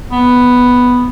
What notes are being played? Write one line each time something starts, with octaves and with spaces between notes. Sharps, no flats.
B3